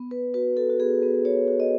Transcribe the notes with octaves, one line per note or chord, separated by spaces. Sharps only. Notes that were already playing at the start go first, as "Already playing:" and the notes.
Already playing: B3
B3 B4
F#4 B4
F#4 A4
F#4
B3 G#4
B3 B4
F#4 C#5
F#4
D#5